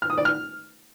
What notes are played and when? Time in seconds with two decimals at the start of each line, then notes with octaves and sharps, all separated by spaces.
0.02 F6
0.10 D#6
0.17 D5
0.25 F6